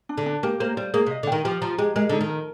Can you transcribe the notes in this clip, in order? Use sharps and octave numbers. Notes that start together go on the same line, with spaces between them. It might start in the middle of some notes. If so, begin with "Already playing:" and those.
D4
D3
D4
A#3 G4
A#3 C5
G3 C5
A#3 G#4
C3
D#5
D3
D#3 G5
F3 G4
F3 A#5
G#3 G4
G#3 A#4
D3 D#4
D#3
A#4